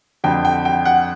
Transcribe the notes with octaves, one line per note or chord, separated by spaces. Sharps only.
F2 D3 G5
G5
G5
F#5